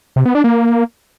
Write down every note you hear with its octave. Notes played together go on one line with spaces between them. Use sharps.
C3
B3
D4
A#3